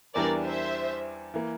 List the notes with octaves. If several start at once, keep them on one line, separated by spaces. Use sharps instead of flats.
E2 E3 G3 D4 A#4 D5
C5 E5
E3 A#3